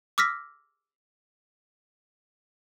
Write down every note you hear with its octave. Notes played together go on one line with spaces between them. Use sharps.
D6 E6 F6 A#6 B6